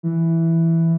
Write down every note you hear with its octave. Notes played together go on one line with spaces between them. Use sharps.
E3